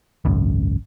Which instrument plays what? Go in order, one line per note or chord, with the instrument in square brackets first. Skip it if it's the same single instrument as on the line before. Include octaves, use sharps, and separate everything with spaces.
[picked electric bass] G#1 C#2 F#2